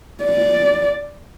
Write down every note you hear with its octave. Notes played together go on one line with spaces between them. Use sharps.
D5